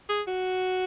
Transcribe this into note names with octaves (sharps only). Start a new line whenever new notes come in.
G#4
F#4